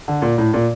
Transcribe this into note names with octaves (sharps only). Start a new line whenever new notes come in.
D3
A#2
A2
A#2